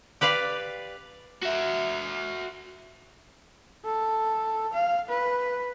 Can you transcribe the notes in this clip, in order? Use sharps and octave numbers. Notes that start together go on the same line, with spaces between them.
G4 B4 D5 F5
F#4 E5
A4
F5
B4